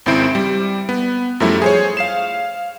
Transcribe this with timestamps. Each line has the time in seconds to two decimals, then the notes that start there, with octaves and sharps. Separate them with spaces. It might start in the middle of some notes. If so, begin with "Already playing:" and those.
0.06 G#1 C#2 C4 E4 C5 D7
0.35 G3
0.89 B3
1.40 F#2 F3 G3 A3 E4
1.62 G#4 C5 C#5
1.97 F5 C7 E7